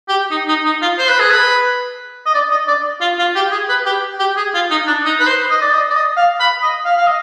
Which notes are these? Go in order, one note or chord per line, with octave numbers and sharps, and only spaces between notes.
G4
D#4
D#4
D#4
F4
C5
B4
G#4
B4
D#5
D5
D#5
D5
F4
F4
G4
G#4
B4
G4
G4
G#4
F4
D#4
D4
D#4
B4
C5
D#5
D5
D#5
D5
D#5
F5
B5
D#5
F5
F5
D#5